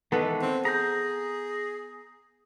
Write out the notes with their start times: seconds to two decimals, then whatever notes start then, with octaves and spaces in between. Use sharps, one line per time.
0.12 D#3 E3 G#3 B3 A4 B4
0.42 C4
0.65 G#4 A#5 G6